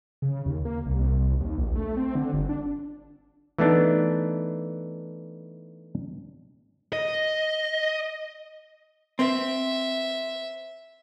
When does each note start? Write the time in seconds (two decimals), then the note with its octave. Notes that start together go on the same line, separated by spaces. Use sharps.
0.22 C#3
0.46 D#2
0.65 A#3
0.86 C2
1.19 C2
1.40 D#2
1.57 A#1
1.76 A3
1.97 C4
2.15 D3
2.33 G1
2.49 D4
3.58 E3 A3 B3 D4 D#4
6.93 D#5
9.19 C4 E5